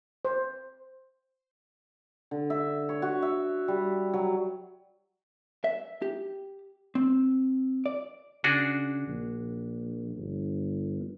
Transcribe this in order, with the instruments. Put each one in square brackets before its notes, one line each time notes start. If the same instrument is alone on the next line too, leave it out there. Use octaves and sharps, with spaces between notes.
[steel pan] C5
[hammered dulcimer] D3
E5
C#5
F#4
E5
G3
F#3
[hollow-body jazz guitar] E5
G4
C4
D5
[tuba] C#3 [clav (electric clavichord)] D4 F#4 G#4
[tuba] A#1
G1